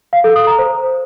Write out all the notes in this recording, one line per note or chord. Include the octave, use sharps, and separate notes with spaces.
F5
A4
D#6
A#5
C5